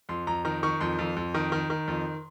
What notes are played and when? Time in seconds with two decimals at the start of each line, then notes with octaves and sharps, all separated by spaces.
0.09 F2 C6
0.27 F2 A#5
0.45 D#3 A#5
0.63 D#3 C#6
0.81 F2 C6
0.99 F2
1.17 F2
1.34 D#3
1.52 D#3
1.70 D#3
1.88 F2